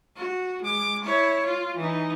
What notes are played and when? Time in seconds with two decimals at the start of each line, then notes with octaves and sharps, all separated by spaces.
0.17 F#4
0.62 G#3 D6
1.04 E4 C#5
1.46 F4
1.76 E3 D#4